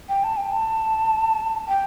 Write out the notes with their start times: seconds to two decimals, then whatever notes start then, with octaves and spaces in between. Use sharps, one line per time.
0.09 G5
0.24 A5
0.37 G5
0.52 A5
1.68 G5